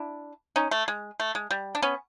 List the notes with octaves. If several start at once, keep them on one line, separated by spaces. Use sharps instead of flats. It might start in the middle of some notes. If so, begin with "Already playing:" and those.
Already playing: D4 E4
C#4 D#4
A3
G#3
A3
G#3
G3
D4
B3 C#4